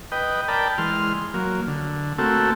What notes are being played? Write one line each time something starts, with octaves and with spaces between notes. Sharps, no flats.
B4 D#5 G5
A#4 D5 G5 A5 B5
E3 G#3 C6 F6
F#3 A#3
D3
A3 A#3 C4 F#4 A4